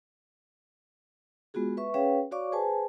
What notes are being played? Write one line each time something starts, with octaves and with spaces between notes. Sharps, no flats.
G#3 B3 F4 F#4 G#4
B4 E5 C#6
C#4 G#4 B4 C#5 F5 G5
F#4 C#5 D5 F5 C#6 D6
G#4 B4 C5 G#5 A5